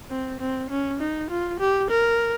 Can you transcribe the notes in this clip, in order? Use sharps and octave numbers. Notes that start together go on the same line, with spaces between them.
C4
C4
C#4
D#4
F4
G4
A#4